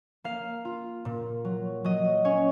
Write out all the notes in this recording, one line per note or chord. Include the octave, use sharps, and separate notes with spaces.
A#3 F5
F4
A#2
F#3
F#3 D#5
C#4 C#5